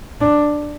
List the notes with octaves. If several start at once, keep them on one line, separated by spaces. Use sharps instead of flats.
D4